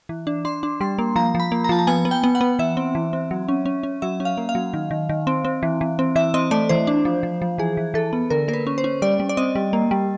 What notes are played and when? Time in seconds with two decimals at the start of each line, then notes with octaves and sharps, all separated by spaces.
0.09 E3
0.27 D4
0.45 D4 C6
0.63 D4
0.81 G3 C6
0.99 A#3
1.16 F3 A#5
1.35 F3 B5
1.52 A#3
1.64 A#5
1.69 F3 A5
1.79 A#5
1.87 B3 G#5
2.05 B3
2.11 G5
2.24 B3
2.35 F#5
2.41 B3
2.59 E3 E5
2.77 C4
2.95 E3
3.13 C4
3.31 F#3
3.48 C#4
3.66 C#4
3.83 C#4
4.02 F#3 E5
4.20 C#4
4.25 F5
4.38 A#3
4.49 F5
4.55 F#3
4.74 D#3
4.91 D#3
5.09 D#3
5.27 C4
5.45 C4
5.63 E3
5.81 E3
5.99 C4
6.16 E3 E5
6.34 C4 D#5
6.51 A3 D5
6.69 E3 C5
6.87 D4
7.05 F3
7.23 F3
7.42 F3
7.58 E3 G#4
7.77 E3
7.94 E3 A4
8.13 B3
8.30 D3 A#4
8.48 A#3 A#4
8.53 B4
8.67 C#4
8.78 C5
8.84 C#4
9.02 G3 D5
9.20 G3
9.29 D5
9.37 C4 D#5
9.55 G3
9.73 A#3
9.91 G3